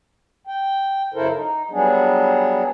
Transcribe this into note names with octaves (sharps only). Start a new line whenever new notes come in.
G5
F#2 C#3 E4 A4 A#4 C5
D#4
F#3 G3 B3 D4 G#4